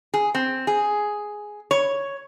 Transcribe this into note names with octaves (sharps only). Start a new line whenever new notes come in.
G#4
C4
G#4
C#5